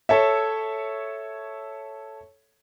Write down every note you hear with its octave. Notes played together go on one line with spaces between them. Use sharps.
A4 C#5 E5